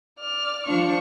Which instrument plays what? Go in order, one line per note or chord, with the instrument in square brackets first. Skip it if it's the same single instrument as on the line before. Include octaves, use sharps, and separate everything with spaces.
[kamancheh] D5 F6
[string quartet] F3 [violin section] D4 [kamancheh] C#6